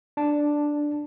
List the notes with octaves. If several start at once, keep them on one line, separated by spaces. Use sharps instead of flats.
D4 A5